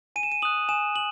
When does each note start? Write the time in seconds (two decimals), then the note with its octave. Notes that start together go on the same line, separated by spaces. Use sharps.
0.16 G#5 D#7
0.23 E7
0.32 D#7
0.42 D#6 F#6 F#7
0.69 G#5 E7
0.96 F#7